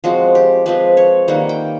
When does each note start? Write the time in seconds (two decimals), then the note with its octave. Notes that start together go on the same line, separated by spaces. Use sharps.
0.04 F3 G#3 C4 F#4
0.35 G4
0.66 F3 G#3 C4 B4
0.97 C#5
1.28 D#3 G3 A#3 F#5
1.49 G5